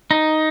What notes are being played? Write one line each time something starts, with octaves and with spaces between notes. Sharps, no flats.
D#4